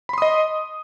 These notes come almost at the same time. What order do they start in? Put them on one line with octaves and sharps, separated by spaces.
B5 C6 D#6 D#5